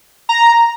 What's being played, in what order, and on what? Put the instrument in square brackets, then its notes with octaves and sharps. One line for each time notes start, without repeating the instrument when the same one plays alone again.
[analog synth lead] A#5